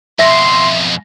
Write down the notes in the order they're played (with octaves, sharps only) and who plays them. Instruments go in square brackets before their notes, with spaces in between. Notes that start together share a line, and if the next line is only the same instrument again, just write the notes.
[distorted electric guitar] F2 B2 [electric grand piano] E5 A#6 [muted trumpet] C6